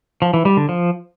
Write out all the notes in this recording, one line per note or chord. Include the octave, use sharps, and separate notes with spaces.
F3
E3
G3
D3
F3